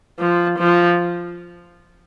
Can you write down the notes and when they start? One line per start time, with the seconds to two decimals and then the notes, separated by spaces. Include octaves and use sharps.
0.19 F3
0.59 F3